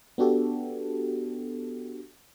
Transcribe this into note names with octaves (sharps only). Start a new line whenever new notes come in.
B3 D4 F#4 G4 A4